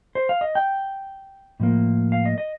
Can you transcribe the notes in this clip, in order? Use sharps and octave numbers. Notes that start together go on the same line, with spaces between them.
C5
F5
D#5
G5
A2 F3 A#3
F5
D#5
D#5